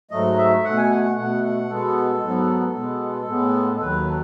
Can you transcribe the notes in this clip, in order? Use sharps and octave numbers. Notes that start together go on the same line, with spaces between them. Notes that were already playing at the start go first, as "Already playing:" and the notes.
G#2 F#3 A3 D#5
E5
B2 A3 F#5
G#5
F#5
F#5
B2 A3 F#5
F#5
B2 G#3 B3 A4
G#2 F#3 B3
B2 G#3 B3
A2 G#3 B3
A4
D#2 D#3 F#3 B4
A4